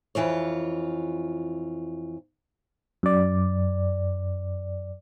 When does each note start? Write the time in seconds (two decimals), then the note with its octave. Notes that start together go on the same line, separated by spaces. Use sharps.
0.15 F2 C#3 E3 F4 C#5
3.03 F#2 D5